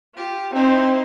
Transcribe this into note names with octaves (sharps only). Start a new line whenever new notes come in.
F4 G4
C4 D#4 E4 C5